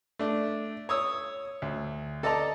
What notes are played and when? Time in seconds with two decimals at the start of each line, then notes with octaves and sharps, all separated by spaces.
0.19 A3 D4
0.89 C#5 D#6 E6
1.62 D2
2.23 A4 D5 D#5 A5 A#5